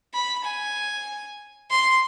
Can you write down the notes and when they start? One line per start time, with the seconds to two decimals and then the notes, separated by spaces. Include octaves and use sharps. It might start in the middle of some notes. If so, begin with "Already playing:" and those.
0.14 B5
0.44 G#5
1.70 C6